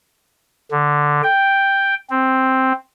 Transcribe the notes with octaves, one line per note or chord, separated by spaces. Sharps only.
D3
G5
C4